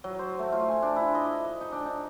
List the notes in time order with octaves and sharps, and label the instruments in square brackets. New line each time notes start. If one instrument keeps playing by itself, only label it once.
[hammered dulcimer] F#3
C5
A3
F4
G#5
D4
E4
D#5
D#5
D#4
D4
D#4